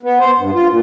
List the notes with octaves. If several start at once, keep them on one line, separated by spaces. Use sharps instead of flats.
B3
C5
G2
F4
A#2